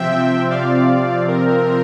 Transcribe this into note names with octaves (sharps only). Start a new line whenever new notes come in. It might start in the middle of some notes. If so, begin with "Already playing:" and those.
Already playing: C3 F3 C4 E5 G5
D5 F5
A#4